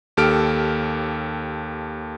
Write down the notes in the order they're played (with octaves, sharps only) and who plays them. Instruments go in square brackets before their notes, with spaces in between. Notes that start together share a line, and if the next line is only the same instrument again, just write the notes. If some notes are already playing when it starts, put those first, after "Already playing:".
[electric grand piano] D#2 G4 A4 F6 D7